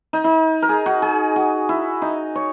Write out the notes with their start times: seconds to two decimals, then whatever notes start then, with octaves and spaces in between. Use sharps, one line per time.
0.13 D#4
0.24 D#4
0.62 A#4
0.69 G#4
0.86 F#4
1.02 G#4
1.36 F#4
1.69 E4
2.02 D#4
2.35 C#5